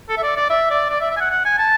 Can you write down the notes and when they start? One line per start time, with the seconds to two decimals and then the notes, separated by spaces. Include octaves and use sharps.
0.09 A4
0.18 E5
0.23 D5
0.37 D5
0.50 E5
0.71 D5
0.90 D5
1.01 E5
1.11 E5
1.17 G#5
1.20 F#5
1.31 F#5
1.45 G#5
1.58 A5